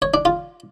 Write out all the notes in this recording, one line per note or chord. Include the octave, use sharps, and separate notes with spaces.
C#5
D4
F4